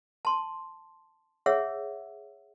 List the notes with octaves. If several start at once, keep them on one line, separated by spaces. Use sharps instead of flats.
A5 C6
G#4 C#5 E5 F#5 E6